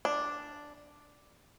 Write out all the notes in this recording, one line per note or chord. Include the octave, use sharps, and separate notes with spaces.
D4